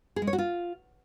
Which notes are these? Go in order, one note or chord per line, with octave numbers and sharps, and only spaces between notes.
G#4
G#3
C#5
F#4
F4